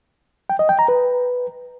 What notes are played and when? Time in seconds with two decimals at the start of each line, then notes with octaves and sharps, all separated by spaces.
0.50 G5
0.59 D#5
0.69 G5
0.79 A#5
0.88 B4